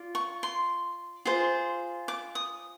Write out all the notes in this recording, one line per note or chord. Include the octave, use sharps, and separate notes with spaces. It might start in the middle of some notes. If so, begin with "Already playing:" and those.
Already playing: F4 D5
C#6
C6
F4 G#4 C5
D6
D#6